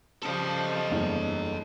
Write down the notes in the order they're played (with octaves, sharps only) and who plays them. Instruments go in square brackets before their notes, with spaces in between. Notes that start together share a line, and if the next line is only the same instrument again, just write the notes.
[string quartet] C#3 F3 G3 [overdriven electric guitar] A4 D#5
[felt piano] F#1 E2 G2